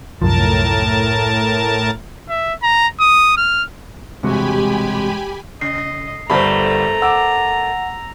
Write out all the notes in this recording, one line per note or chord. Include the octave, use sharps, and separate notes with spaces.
C2 F#2 A2 F3 A#4 A5
E5
A#5
D#6
F6
E1 G2 C3 G#3 F#4 G4 G#5 B5
C#3 D#5 C7
G1 G3 A3 A#4 C5 A#5 B5
F#5 D6 E6